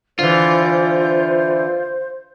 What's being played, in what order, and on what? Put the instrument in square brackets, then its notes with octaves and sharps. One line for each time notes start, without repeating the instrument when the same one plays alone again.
[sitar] D3 E3 [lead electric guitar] F4 [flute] C5